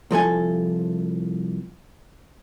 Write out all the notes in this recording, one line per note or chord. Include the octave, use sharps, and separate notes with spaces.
C2 F3 A4 G#5